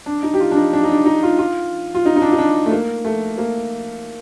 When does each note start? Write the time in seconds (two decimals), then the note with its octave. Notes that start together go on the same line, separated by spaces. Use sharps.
0.06 D4
0.23 D#4
0.34 G4
0.40 F4
0.51 D4
0.56 D#4
0.73 D4
0.83 D#4
0.89 D4
1.05 D#4
1.23 F4
1.38 F4
1.94 F4
2.06 D#4
2.16 D#4
2.22 D4
2.32 D#4
2.38 D4
2.66 A3
2.71 A#3
3.05 A3
3.38 A#3